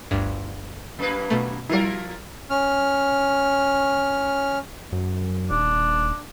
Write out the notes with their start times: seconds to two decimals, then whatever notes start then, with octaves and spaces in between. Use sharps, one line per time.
0.11 G1 D2 G2
0.99 F#2 A#3 B4
1.30 B2 A3
1.69 F3 G3 E4 F4 A#4
2.50 C#4 F6
4.92 F#2
5.51 D#1 D4